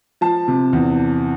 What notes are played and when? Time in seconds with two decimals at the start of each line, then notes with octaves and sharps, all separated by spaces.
0.21 F3 A5
0.48 C3
0.73 E2